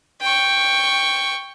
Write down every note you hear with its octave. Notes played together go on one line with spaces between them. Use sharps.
G5 C#6